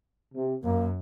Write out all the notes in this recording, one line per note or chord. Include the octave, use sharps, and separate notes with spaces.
C3
F#2 A#3